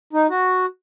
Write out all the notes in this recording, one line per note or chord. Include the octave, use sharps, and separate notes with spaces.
D#4
F#4